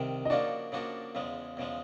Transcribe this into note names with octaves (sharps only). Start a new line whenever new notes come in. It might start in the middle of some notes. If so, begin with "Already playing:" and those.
Already playing: C2 C3 D#3
D#5
C#3 F3 A#3 D4 F#4 D5
C#3 F3 A#3 D4 F#4
E2 C#3 F3 G#3
E2 C#3 F3 G#3